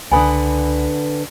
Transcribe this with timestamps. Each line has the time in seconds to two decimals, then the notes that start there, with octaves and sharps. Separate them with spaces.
0.11 C#2 D3 B4 F#5 G#5 B5 D#6